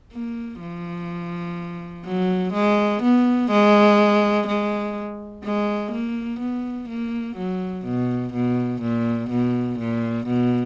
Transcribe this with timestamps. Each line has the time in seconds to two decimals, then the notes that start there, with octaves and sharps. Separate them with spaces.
0.13 A#3
0.60 F3
2.05 F#3
2.53 G#3
3.03 B3
3.51 G#3
4.47 G#3
5.44 G#3
5.92 A#3
6.40 B3
6.89 A#3
7.36 F#3
7.85 B2
8.33 B2
8.82 A#2
9.30 B2
9.79 A#2
10.27 B2